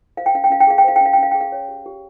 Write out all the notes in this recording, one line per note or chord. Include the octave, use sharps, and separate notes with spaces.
C5 F5
G5
C#4 F5
G5
C#4 F5
G5
G#4 F5
G5
C5 F5
G5
C#4 F5
G5
C#4 F5
G#4 G5
F5
C#5
G4
G4